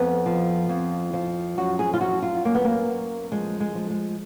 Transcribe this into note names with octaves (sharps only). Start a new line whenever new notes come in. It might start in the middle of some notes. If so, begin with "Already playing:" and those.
Already playing: F2 B3
F3
F2
F3
F#2 F#4
G#4
F4
F#2 F#4
F4
F#2 A#3
B3
A#3
F#2
F3 G#3
G#3
F3
G#3